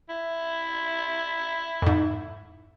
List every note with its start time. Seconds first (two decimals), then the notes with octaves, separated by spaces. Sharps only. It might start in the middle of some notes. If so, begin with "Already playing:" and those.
0.09 E4
1.82 F2 G#2